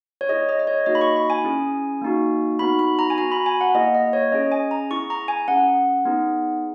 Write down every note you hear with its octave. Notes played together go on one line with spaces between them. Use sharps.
C#5
B3 E4 G#4 D#5
D#5
D#5
C#5
A#3 D#4 F#4 D#5
B5
C#6
B5
G#5
C#4 E4 G#4
A#3 D#4 F#4
B3 D#4 F#4 B5
B5
A#5
G#5
B3 F#4 A#5
B5
G#5
F#5
A#3 E4 G#4 D#5
D#5
C#5
C#4 G#4 D#5
G#5
A#5
B3 E4 G#4 C#6
A#5
G#5
C#4 G#4 F#5
B3 D#4 G#4